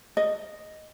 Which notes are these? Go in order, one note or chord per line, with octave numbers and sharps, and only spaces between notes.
D#5